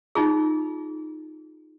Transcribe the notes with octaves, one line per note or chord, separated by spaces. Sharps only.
D#4 F4 G#4